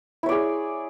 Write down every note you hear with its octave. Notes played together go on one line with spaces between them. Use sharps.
E4 G#4 C#5 D5